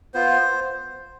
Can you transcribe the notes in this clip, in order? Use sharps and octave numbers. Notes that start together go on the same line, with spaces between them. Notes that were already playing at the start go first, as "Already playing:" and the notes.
B3 F4 C5